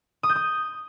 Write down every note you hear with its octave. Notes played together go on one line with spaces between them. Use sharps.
D#6
G6
D#6